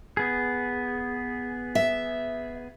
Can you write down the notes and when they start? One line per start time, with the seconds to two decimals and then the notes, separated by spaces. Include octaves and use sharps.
0.17 B3 G#4
1.75 E5